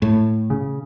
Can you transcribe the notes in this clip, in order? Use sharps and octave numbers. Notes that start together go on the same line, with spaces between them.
A2
C#3